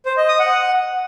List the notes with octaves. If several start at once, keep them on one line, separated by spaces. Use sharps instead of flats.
C5
D#5
D#6
F#5